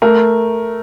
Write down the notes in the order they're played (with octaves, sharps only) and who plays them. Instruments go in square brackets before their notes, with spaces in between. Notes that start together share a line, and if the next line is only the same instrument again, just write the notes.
[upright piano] A3 A#4